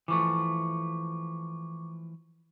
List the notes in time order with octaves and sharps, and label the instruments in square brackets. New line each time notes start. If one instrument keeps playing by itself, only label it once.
[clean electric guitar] E3 F3 A3 [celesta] C#6 D6